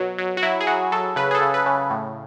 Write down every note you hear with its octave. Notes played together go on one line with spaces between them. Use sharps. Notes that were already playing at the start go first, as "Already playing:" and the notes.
Already playing: B2 F#3
F#3
F#4
F#3 E4
G#4
F#3 F#4
F#3 A4
C#3 B4
G#4
A4
C#3
B4
C#3
A2